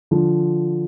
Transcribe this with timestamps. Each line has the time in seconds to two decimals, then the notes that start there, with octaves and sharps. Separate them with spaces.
0.11 D3 F3